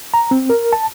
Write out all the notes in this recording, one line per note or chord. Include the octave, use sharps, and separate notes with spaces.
A#5
C4
A#4
A5